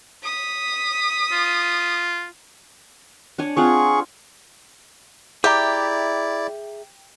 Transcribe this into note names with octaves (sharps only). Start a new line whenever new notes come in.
D#6 B6
F4
D4 C#5 G#5
C4 F4 G#4 F#5 C#6
E4 G4 G#4 D5 E5 A#5